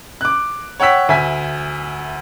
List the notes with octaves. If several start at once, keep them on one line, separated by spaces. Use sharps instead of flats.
D6 F#6
C#5 F#5 G5 E6 B6
D2 E5 G#5 B6